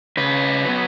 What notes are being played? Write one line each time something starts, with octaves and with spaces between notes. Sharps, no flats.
C#3 B4
F#3 B3